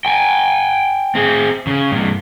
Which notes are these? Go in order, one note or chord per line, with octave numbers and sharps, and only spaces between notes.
G5 G#5
C4 G#4
C#3
G2 C3